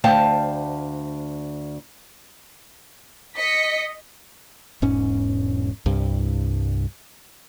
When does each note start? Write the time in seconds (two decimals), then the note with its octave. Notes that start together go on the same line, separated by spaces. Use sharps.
0.04 D2 C5 F5 G5 A5
3.36 D#5 B6 C#7
4.82 E1 G#2 C#4
5.86 C2 G2